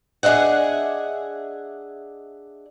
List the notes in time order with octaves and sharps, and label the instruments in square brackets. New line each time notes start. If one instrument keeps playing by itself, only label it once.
[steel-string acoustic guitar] D4 G#4 D#5 E5 F#5